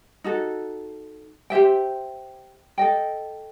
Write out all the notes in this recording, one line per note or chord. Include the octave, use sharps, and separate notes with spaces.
D#4 F#4 A4
G4 C5 E5 G5
A4 D#5 G5